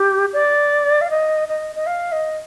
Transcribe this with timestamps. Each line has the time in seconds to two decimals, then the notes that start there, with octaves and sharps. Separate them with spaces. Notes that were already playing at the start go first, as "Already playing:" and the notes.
Already playing: G4
0.33 D5
1.01 F5
1.10 D#5
1.48 D#5
1.75 D#5
1.86 F5
2.12 D#5